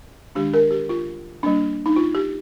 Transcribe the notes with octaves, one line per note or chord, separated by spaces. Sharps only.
D#3 G#3 D4 G4
A#4
G4
F4
G3 A#3 D4
D#4
F4
G4